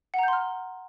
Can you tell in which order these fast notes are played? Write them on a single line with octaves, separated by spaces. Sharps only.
F#5 A#5 G6 C6 F6